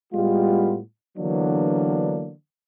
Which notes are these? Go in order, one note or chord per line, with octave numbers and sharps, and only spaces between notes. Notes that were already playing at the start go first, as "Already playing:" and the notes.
A2 G3 G#3 B3 F4
D3 E3 F#3 A#3 B3 D4